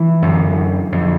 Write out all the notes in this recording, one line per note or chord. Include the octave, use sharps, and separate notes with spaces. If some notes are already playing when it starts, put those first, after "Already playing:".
Already playing: E3
F#2 D3
F2 D3